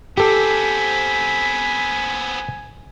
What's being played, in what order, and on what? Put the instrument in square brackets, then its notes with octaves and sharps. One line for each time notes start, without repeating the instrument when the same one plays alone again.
[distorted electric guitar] B3 C4 [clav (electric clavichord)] G4 A4 [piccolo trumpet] G#5 [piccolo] B6